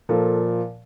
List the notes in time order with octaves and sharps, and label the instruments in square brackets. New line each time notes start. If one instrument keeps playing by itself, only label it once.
[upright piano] A#2 F3 A4